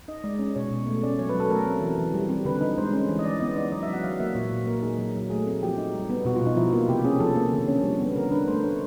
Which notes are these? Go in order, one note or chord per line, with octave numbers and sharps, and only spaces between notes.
D#4 D#5
G#3 D5
C#4
B2 C#5
B2
A3
C#4 D5
F#3 C#5
B4
F#3
A4
A3 A#4
C4
E3
E3
G3
C4
D3 B4
D#4
G#3 C5
C#4
E3
D#5
E3 D5
B3 D#5
D#4 D5
F#3 D#5
E5
F#3
F#5
F#3 F5
A#3 E5
A#2 C#5
A#2
A#3 A#4
D#4 G#4
F#3
F#3
A3 G#4
C4
F3 G4
D#4
G3
B3
B2 F#4
F4
B2 D#4
F3 E4
A#3 F4
C3 G4
C#4 G#4
F3 A4
A#3
D3
C#4
G3
B3
D3 A#4
D4 B4
A3 C5
D4 C#5